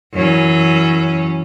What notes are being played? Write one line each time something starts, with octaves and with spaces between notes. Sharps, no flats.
F#2 E3 C#4